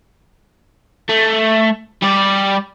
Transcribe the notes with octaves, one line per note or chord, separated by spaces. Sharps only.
A3
G3 D5